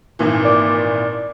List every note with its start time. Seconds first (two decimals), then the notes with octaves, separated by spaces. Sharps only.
0.19 G#1 A#2 E3
0.45 D5